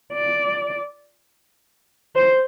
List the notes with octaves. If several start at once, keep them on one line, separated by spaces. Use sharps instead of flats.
D5
C5